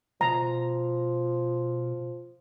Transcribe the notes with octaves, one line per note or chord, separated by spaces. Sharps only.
B2 F3 A#5